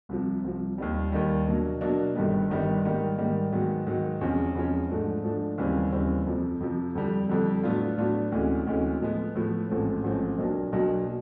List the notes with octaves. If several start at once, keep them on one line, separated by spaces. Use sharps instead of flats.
C2 C3 F3
C2 C3 F3
D#2 D#3 G3
D#2 D#3 G3
B2 F#3 A#3 D4
B2 F#3 A#3 D4
G1 G2 D#3 G3 B3
G1 G2 D#3 G3 B3
G#2 D#3 G3 A#3
G#2 D#3 G3 A#3
G#2 D#3 F#3 B3
G#2 D#3 F#3 B3
E2 C3 F3 G#3 C#4
E2 C3 F3 G#3 C#4
G#2 F3 A3 D4
G#2 F3 A3 D4
D#2 C#3 E3 G3 C4
D#2 C#3 E3 G3 C4
F2 C3 F3
F2 C3 F3
F2 D3 G3
F2 D3 G3
A2 F#3 B3 D4 F4
A2 F#3 B3 D4 F4
D2 C3 E3 G#3 C#4
D2 C3 E3 G#3 C#4
A2 F3 G#3 B3
A2 F3 G#3 B3
A1 G#2 F3 A3 C4
A1 G#2 F3 A3 C4
B1 B2 F#3 A#3 D4
B1 B2 F#3 A#3 D4